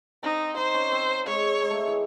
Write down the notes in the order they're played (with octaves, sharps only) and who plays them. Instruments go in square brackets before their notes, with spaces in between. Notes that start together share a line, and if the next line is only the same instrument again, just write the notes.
[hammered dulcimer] C4 [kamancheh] D#4
[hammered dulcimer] D#4 [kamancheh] C5
[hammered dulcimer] C#4
C4
[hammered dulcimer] G#3 [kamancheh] C#5
[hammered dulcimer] G#3
A3
G#3
E3